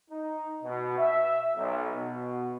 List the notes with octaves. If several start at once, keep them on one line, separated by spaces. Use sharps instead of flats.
D#4
B2
E5
B1
B2